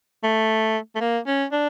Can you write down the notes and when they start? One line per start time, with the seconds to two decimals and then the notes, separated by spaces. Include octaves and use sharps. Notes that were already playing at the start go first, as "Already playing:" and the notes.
0.24 A3
0.96 A3
1.01 A#3
1.27 C#4
1.52 D4